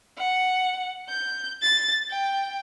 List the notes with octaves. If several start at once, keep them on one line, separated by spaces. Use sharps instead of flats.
F#5
G6
A6
G5